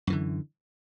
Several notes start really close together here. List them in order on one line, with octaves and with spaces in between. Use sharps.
F#2 E3 D3